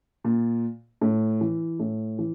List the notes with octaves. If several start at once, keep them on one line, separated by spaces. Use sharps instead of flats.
A#2
A2
E3
A2
E3